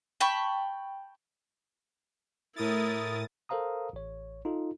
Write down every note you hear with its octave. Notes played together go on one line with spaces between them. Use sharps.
G5 A5 B5 C#6
A2 E4 A#4 D#6 A6
A4 A#4 C5 F5 A#5 D#6
A1 C#5
D#4 F4 A4